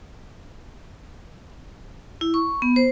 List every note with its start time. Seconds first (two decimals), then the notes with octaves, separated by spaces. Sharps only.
2.21 E4
2.34 C#6
2.62 B3
2.76 C5